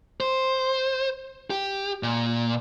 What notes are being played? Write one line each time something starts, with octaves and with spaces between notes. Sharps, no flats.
C5
G4
A#2